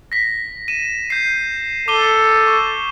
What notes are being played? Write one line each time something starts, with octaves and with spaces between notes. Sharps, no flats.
A#6 B6
D#7 E7
G6 C7
A4 D6 D#7 G7
C#6